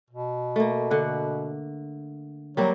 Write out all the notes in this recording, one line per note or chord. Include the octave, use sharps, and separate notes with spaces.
B2
A3 A#3
D3 F#5
F#3 G3 A#3 C4